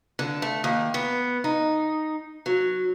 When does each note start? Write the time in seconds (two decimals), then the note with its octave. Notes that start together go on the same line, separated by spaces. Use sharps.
0.19 D3
0.42 A3
0.64 D#2
0.94 B3
1.44 D#4
2.46 F#3